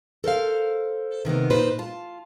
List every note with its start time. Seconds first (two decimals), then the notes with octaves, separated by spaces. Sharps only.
0.24 A4 A#4 C5 F5
1.25 C3 D#3 A#3 B3
1.50 A#2 D#4 B4 C5
1.79 F4 A5